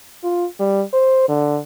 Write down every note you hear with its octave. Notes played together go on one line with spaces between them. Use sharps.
F4
G3
C5
D3